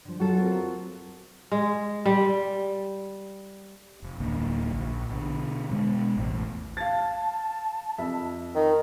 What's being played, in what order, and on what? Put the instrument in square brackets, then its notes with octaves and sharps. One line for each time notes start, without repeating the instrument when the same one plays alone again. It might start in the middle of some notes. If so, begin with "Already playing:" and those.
[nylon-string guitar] D3 F3
[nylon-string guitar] F#3 F4 A4 [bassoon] F#4
[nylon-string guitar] C4 F4 A#4
[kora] G#3
G3
[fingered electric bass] F1
D1 D3 A#3
A#1
B2 D3
B2 G#3
A1 E2 A2
[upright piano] F5 A6 [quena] A5
[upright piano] F2 E5
[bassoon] D#3 [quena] D#5